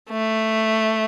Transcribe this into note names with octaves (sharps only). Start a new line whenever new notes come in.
A3